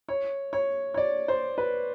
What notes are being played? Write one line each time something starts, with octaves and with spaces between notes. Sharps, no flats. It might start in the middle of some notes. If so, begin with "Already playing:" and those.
C#5
C#5
C#5
D5
C5
B4